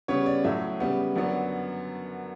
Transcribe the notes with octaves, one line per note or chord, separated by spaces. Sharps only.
C#3 G3 B3 C#5
D5
A2 F#3 A3 E5
C#3 G3 B3
F#2 D3 F#3 B3 D5